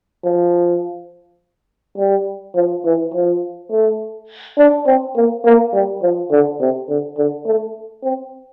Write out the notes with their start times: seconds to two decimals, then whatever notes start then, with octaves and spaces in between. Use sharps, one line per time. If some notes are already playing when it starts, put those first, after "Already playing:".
0.25 F3
1.98 G3
2.55 F3
2.85 E3
3.14 F3
3.71 A3
4.58 D4
4.87 C4
5.16 A#3
5.45 A#3
5.73 G3
6.02 F3
6.31 D3
6.60 C3
6.89 D3
7.18 D3
7.46 A3
8.04 C4